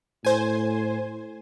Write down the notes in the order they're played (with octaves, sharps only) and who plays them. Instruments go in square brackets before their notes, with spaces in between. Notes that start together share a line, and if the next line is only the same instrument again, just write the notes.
[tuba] A2 [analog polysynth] C5 G#5